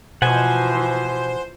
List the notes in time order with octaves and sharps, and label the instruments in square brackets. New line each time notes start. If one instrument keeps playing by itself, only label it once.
[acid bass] B2 [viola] E3 F3 [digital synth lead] C5 [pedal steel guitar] F#5 G#5